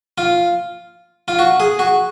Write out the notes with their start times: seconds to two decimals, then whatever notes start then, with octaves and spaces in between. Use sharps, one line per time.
0.18 F4
1.28 F4
1.39 F#4
1.60 G#4
1.79 F#4